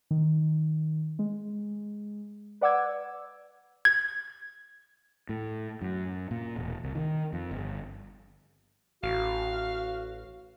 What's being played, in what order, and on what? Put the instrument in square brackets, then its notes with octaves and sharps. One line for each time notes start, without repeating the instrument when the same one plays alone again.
[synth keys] D#3
G#3
B4 D5 F#5 D6 E6 G#6
[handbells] G#6
[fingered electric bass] A2
F#2
A#2
E1
C2
D#3
F2
G1
[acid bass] A1 [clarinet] F#4 [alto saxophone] F5